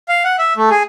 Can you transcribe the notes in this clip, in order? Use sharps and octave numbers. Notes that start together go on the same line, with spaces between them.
F5
F#5
E5
A3
G#4